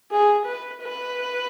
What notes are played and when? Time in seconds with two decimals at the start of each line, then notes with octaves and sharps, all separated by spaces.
0.12 G#4
0.47 B4
0.82 B4